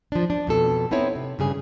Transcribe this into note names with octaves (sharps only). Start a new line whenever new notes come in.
F3 D4
D4
F2 B2 A4
B3 C4 D#4 E4 C#5
C3
G2 C#3 G#4 G#5